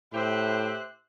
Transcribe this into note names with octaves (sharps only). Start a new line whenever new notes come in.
A2 G4 C5 E5 F#6